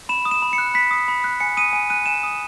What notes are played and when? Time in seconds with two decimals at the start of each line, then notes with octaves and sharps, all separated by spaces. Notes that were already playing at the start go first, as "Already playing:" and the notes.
0.09 B5 E7
0.25 D#6
0.31 E7
0.42 B5
0.53 C#7
0.58 F#6
0.74 B5 B6
0.91 D#6
1.08 B5
1.24 F#6
1.40 G#5 C#7
1.57 D#6 D#7
1.73 G#5
1.90 F#6 D#7
2.06 G#5 E7
2.23 D#6